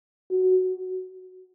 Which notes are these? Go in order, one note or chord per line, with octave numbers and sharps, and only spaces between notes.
F#4